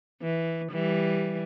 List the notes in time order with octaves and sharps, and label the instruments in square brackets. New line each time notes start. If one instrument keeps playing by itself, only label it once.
[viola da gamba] E3
E3 G3